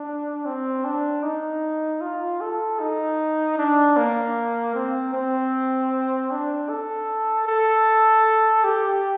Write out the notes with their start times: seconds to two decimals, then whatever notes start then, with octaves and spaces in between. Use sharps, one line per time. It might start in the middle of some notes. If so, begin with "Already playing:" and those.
Already playing: D4
0.45 C4
0.85 D4
1.23 D#4
2.01 F4
2.41 A4
2.80 D#4
3.58 D4
3.97 A#3
4.75 C4
5.13 C4
6.31 D4
6.69 A4
7.47 A4
8.64 G4